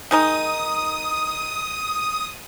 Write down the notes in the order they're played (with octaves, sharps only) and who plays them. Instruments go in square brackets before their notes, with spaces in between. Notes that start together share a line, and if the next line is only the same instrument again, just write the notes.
[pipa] D#3 G#3 D#4 [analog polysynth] D#6